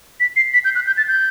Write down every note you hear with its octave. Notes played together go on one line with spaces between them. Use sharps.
B6
C7
B6
G6
F#6
G6
A6
G6